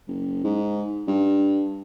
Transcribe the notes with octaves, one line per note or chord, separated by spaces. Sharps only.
F#1
G#2
G2